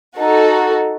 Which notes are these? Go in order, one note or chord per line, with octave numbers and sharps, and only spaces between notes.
D#4 F#4 A4